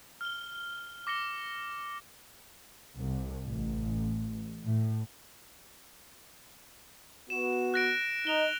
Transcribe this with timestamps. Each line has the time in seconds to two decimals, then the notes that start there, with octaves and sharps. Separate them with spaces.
0.21 F6 G7
1.07 D6 A#6 C#7 G7
2.97 C2
3.47 A1
4.64 A2
7.30 B3 F#4 E7
7.74 F#6 A#6 D7
8.27 D#4 F7 G7